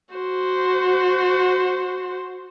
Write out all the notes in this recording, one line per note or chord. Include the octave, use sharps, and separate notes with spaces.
F#4 C5